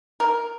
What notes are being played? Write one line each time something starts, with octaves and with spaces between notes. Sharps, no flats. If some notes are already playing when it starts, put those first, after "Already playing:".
A#4